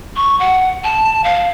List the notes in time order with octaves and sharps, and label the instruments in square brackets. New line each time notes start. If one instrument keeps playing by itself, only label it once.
[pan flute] C#6
F#5
A5
F5